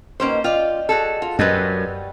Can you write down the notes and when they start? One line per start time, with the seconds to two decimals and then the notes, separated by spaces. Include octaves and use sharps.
0.20 G2 B2 D#3 A#3 C#4 C5
0.44 F4 D5 D#5 G5
0.89 F#4 G#4 A4
1.22 F4
1.39 F#2 G3 F#4 B4 C5 D#5 G5